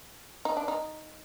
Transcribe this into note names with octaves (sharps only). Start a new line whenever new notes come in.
D#4
D4
D#4